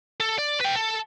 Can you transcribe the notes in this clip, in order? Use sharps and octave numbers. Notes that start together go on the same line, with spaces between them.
A4
D5
B4 G5
A4